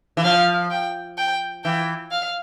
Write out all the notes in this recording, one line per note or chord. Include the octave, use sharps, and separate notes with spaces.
E3
F3 F5
G5
G5
E3 G5
F5